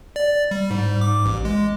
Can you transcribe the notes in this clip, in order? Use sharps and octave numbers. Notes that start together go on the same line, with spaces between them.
D5
G3
G#2
D6
A1
G#3